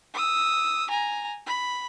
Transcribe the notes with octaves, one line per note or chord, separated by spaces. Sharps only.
D#6 E6
G#5 A#5
B5